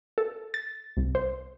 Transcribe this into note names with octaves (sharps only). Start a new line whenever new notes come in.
A4
A6
C2
C5